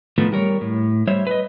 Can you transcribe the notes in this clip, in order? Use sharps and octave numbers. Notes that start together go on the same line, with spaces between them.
A2 D#3 F3 A3 B3
G3 A#4 C#5
A2
G3 C5 C#5 E5
B4 D#5